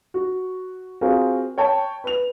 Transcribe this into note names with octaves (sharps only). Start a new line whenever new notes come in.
F#4
C4 F4 F#4 G#4 A#4
C#5 G5 A5
B4 F7